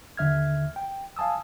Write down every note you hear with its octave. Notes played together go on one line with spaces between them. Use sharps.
D#2 D3 E5 F6 G#6
G5
F5 G#5 A5 D#6 E6